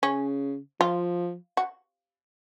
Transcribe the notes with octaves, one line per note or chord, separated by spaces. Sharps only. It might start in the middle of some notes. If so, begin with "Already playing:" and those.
C#3 C#4
F3 F4
F#4